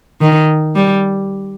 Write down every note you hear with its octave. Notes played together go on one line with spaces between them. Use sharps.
D#3
G3